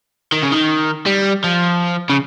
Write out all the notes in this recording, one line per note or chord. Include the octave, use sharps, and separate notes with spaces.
D#3
C#3
D#3
G3
F3
C#3